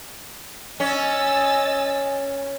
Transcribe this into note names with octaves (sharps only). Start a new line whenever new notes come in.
C#4 D#5 G#5 E6 A6